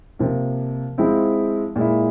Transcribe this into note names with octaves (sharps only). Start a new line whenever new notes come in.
C3 F3 A#3
F3 G#3 C4 E4
A#2 G#3 E4